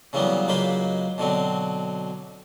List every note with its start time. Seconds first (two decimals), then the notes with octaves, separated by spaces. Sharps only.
0.13 C#3 E3 F#3 G3 A#3 B3
0.48 C#2 F#3 G#3 A#3 C5 B5
1.18 B2 D3 F#3 C4